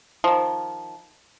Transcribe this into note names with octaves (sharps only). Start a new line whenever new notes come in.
D#3 F3